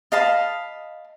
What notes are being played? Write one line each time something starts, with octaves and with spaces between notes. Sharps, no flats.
D#5 F5 A5 B5